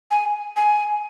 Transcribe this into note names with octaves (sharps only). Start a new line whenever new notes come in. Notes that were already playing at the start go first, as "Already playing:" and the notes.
G#5
G#5